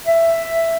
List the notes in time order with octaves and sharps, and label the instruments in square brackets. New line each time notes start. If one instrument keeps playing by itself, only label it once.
[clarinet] E5